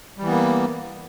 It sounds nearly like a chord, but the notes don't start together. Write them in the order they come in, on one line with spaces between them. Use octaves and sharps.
G3 E3 B3 A#3